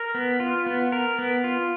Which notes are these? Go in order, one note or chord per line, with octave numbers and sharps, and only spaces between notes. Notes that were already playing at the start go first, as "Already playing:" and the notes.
Already playing: A#4
B3
F4
B3
A#4
B3
F4